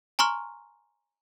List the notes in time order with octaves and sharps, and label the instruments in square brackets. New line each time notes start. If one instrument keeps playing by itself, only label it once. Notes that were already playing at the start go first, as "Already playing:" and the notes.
[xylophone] G#5 A#5 C6 C#6 F6